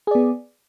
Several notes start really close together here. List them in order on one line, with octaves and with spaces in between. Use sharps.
G#4 D5 B3